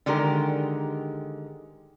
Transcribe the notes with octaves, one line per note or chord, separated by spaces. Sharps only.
D3 D#3 G#3 G4 A#4